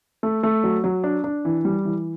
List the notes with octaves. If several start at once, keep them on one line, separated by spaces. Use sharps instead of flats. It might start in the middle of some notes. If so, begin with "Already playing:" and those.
A3
A3
F#3
F#3
D4
D4
E3
G3
E3